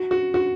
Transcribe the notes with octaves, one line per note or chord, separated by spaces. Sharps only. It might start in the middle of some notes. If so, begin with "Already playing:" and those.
Already playing: F#4
F#4
F#4